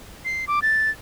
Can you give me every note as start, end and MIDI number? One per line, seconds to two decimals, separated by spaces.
0.25 0.45 96
0.48 0.60 86
0.62 0.90 93